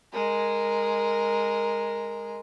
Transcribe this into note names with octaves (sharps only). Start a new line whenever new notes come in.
G#3 A#4